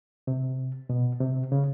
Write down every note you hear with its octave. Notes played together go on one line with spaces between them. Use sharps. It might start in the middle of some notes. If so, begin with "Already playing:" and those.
C3
B2
C3
C#3